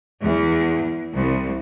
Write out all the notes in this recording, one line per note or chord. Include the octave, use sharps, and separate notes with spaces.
E2
C2